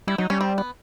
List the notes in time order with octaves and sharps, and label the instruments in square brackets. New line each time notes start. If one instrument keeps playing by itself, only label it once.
[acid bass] G3 [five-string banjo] E4
[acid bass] F#3 [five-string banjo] D#4
[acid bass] G3 [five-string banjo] C#4
[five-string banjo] C4
B3